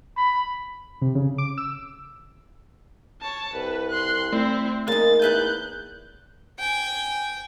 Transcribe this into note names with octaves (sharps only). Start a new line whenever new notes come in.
B5
C3
C#3
D6
E6
C#5 A5
C2 B4
C6 F#6
A3 C4 E4
C#3 A#3 D#4 A6
E2 B4 E5 G#5 F#6 G6
G5 G#5